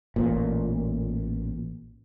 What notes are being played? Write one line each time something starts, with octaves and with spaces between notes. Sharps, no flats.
A1 A#2